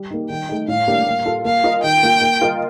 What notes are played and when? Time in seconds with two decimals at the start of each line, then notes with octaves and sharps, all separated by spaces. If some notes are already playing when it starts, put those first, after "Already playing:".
Already playing: G3
0.11 A#3 D#4
0.30 D#3 G5
0.49 A3 D#4
0.68 A2 F5
0.88 G3 A#3 D4 G4
1.06 A#3
1.26 F4 A4
1.45 A#3 F5
1.64 F4 A#4 D#5
1.83 D#3 G5
2.03 A#3 F4
2.22 A#3
2.41 F4 A#4 D#5